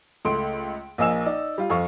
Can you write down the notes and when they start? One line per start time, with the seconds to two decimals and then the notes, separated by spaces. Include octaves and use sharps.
0.25 C#2 A3 C6 D7
0.98 A#1 A#3 D#5 G#5 E6 E7
1.26 D#4 D5
1.58 G3 F4
1.70 F2 A4 F5 C#6